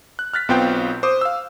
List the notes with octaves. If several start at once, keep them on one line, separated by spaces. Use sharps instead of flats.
F#6
F6 F#6 A6 B6
B1 B3 C4 F4 G5 G6
C5 D6 D#6
F5 E6